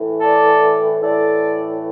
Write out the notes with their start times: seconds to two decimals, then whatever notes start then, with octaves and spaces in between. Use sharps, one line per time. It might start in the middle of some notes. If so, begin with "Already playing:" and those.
Already playing: A2 E3
0.20 A4 D5
1.01 A2 E3 A4 D5